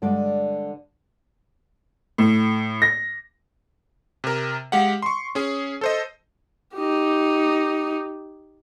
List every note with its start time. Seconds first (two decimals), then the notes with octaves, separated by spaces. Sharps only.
0.02 G2 D3 G#3 D5
2.18 A2
2.82 A#6
4.24 C3 A#4
4.72 G#3 G4 F5 F#5
5.02 C6 C#6
5.35 C#4 G#4
5.81 A4 C5 D#5
6.75 D#4 G4